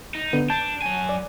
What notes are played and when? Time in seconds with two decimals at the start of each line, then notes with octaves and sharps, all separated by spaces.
0.15 D#4
0.33 D3 B3
0.50 D4 A5 G6
0.82 F#3 G#5
1.09 D5